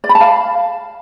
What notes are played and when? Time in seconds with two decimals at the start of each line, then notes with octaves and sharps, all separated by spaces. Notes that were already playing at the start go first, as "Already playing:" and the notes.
0.04 D5
0.09 B5
0.15 A5
0.21 F5